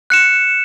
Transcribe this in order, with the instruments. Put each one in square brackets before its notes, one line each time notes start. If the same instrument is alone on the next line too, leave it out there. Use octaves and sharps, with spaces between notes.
[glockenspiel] F#6 C#7 E7